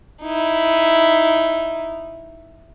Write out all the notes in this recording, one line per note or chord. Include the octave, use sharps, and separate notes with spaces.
D#4 E4